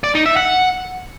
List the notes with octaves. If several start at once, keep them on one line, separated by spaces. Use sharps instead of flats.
D5
D#4
E5
F#5